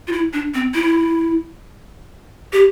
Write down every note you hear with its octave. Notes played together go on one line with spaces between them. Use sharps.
F4
E4
D4
C4
E4
G4